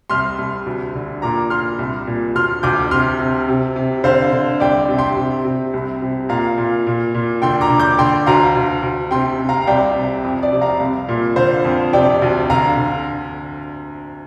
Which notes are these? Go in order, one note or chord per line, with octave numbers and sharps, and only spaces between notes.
C2 C6 F6
C2
D2
D3
A#2 A#5 D6
A#2 C6 F6
C2
A#2
D2 C6 F6
D2 D6 G6
C3 C6 F6
C3
C3
C3
D3 C5 F5
D3
C2 D5 G5
C3
G5 C6
C3
C3
C2
C3
A#2 F5 A#5
A#2
A#2
A#2
D3 G5 C6
A#5 D6
D3
D6 G6
D3 G5 C6
D2 F5 A#5
D2
D2
C3 G5 C6
C3
F5 A#5
A#5
C2 D5 G5
C3
F2
D5
C3
F5 A#5
C2
A#2
D3 C5 F5
F2
C3 D5 G5
D2
D3 F5 A#5
D3